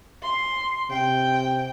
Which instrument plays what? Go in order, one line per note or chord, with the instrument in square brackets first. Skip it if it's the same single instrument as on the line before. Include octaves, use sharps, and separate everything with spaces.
[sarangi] C6
[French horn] C3 [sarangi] G5